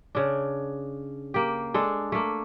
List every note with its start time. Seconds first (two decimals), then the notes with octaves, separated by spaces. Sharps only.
0.15 C#3 D4
1.34 A#3 G4
1.74 G#3 D4 A4
2.12 A3 A#3